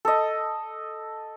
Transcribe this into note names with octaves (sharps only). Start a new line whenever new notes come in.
A4 D#5